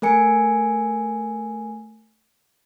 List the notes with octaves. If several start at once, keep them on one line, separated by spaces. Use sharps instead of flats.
A3 A#4 G#5 C#7